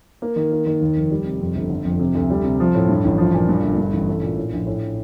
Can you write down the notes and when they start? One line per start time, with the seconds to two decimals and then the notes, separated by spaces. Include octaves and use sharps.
0.22 A#3
0.36 D#3
0.52 A#3
0.66 D#3
0.81 D#2
0.96 F1
1.11 G3
1.25 C3
1.40 F2
1.55 G1
1.70 D3
1.84 F2
1.99 C3
2.15 D2
2.30 G3
2.44 C3
2.60 F3
2.75 A2
2.89 G2
3.04 A1
3.18 F3
3.34 A#2
3.49 G2
3.63 G1
3.78 G2
3.93 A1
4.08 A3
4.22 A#2
4.37 A2
4.53 A#1
4.66 A2